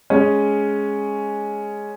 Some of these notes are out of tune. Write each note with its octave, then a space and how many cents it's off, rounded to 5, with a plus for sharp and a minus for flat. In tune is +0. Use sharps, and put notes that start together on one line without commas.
G#3 +0 C#4 +0